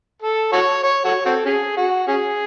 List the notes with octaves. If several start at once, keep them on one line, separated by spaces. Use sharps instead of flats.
A4
F#4 A4 C#5
C#5
F#4 A4 C#5
C4 F#4 A4
C#4 G#4
F#4
C#4 G#4